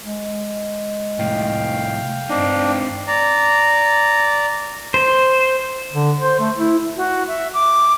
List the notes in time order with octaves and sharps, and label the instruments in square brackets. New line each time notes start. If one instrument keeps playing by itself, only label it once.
[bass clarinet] G#3
[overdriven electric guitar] C2 A2 [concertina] F5 G5
[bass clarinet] G2 [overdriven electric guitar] C4 D#4 [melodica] D4
[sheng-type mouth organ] D5 A#5
[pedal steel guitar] C5
[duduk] D3
C5
A3
E4
[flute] F#4
E5
D6